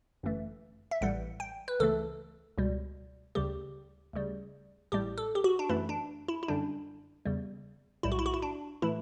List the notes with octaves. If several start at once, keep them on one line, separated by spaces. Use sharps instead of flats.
G1 F#2 E3 A3
E5
A1 A2 E3 G3 F#5
G5
B4
C#2 C#3 E3 A3 A4
C#2 B2 G3
D2 C#3 G3 G4
D2 C#3 G3
A1 A2 G3 G4
A4
G4
F#4
D4
F#2 E3 A3 E4
D4
E4
E4
F#2 D3 G3 D4
E2 C#3 G3
B1 A2 G3 E4
F#4
E4
F#4
E4
D4
A2 E3 A3 E4